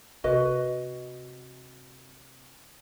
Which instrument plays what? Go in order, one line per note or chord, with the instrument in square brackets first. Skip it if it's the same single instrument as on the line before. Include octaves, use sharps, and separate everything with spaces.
[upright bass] C3 [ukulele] F#4 B4 D#5